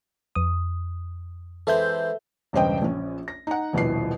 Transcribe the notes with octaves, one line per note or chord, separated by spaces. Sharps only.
F2 D#6
E3 G#3 C4 A4 E5 G6
E1 G2 C#3 C5 D#5 G5
A#1 C#4
A#6
D#4 F#5
D#1 A#1 B2 E3 C7